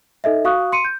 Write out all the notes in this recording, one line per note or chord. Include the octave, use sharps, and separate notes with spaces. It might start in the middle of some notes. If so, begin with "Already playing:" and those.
D#4 A4 D#5 E5
F#4 F5 C#6 D#6 F#6
C6 C#7 D#7
G6